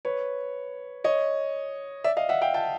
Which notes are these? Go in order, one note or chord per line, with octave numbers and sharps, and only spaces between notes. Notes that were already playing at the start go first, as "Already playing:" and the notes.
B4 C#5
C#5 D#5
D5 E5
D#5 F5
E5 F#5
F5 G5
G5 A5